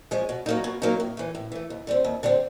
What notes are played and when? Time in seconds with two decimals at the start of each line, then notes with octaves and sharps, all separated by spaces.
0.11 F3 G#3 C#4
0.29 B2
0.46 F#3 A#3 D#4
0.64 B2
0.82 F#3 A#3 D#4
1.00 A2
1.17 E3 A3
1.35 A2
1.52 E3 A3
1.70 D#2
1.87 D3 G3 C4
2.04 D#2
2.23 D3 G3 C4